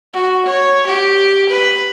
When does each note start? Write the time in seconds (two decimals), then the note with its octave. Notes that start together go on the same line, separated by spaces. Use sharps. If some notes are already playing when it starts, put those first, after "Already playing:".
0.14 F#4
0.46 C#5
0.86 G4
1.49 B4